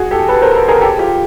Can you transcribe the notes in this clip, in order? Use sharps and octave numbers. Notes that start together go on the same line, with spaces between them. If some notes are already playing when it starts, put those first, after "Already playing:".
Already playing: F#4 G#4
G4 A4
A4 B4
A#4 C5
A4 B4
G#4 A#4
G4 A4
F4 G4